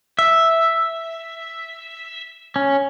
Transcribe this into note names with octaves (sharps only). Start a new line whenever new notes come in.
E5
C#4